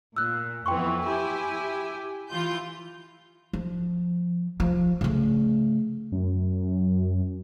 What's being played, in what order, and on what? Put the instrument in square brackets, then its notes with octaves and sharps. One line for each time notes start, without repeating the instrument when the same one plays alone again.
[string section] A#2 [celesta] E6 F#6
[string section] F2 E3 B3 [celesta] G5 C6 C#6
[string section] E4 G4 G#5
E3 F4 G6
[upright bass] F3
F3
C#3 A3
[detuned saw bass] F#2